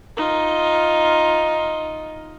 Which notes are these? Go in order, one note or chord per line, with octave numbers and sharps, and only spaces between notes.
D#4 F4